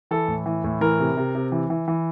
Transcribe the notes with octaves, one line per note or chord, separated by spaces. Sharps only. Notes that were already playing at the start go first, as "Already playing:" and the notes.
E3 A4
A2
E3
A2
E3 A#4
C3
C3
C3
E3
E3
E3